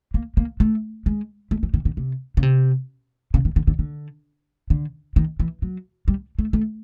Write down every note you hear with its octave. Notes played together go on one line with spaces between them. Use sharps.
A#3
A#3
A3
G#3
A3
E3
D#3
D3
C3
C#3
C3
C#3
D#3
D3
D3
D3
D3
D#3
E3
F#3
G3
A3
A3